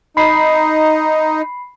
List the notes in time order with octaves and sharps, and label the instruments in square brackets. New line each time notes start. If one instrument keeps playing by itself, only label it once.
[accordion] D#4 [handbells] B5 C7